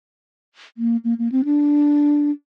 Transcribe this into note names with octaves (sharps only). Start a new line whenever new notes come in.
A#3
A#3
A#3
C4
D4